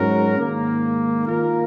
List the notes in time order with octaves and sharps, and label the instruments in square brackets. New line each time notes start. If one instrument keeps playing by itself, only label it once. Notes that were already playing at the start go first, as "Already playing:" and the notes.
Already playing: [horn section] G#2 F#3 C#4 F#4 A#4
G#2 D#3 A#3
D#3 A#3 F4 A#4